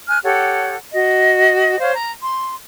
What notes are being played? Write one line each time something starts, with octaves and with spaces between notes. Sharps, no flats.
G#5 F6 F#6
G4 A4 C#5 F#5
F#4 D#5
C5 C#5 F5
A#5
C6